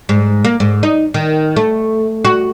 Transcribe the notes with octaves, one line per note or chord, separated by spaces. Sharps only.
G#2
A#3
G#2
D#4
D#3
A3
F#4